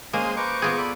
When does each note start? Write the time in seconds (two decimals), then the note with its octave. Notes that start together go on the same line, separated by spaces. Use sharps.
0.13 G#3 A#3 C#4 C5 D#5 G#5 D#6
0.37 B4 C5 A#5 C#6 D6
0.62 B3 F4 G#4
0.77 A4 D5 B5